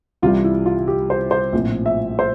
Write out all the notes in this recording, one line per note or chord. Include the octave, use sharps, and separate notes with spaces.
C2 C3 E3 G3 F4
E4
F4
G4
C5
C5
A#1 A2 F3 C4
E5
C5